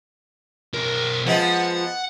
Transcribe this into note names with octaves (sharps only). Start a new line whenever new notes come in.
B1 A#4
F3 G#3 B3 F#5